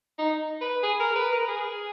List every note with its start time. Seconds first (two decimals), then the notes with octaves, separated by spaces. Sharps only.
0.18 D#4
0.61 B4
0.83 G#4
1.00 A#4
1.16 B4
1.32 A#4
1.48 G#4